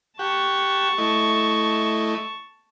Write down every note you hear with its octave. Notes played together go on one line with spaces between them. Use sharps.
G4 F#5 A5 C#6
A3 E4 D#5